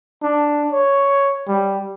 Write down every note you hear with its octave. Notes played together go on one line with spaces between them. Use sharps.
D4
C#5
G3